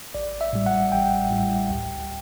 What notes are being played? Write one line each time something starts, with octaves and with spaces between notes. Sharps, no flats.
A1 D5
E5
A2 G3
F#5
A1 G5
A2 G3
D2